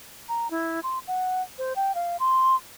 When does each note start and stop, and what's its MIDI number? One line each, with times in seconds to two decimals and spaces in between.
0.29 0.50 82
0.51 0.80 64
0.83 0.99 84
1.07 1.42 78
1.58 1.73 72
1.76 1.95 79
1.95 2.17 77
2.20 2.56 84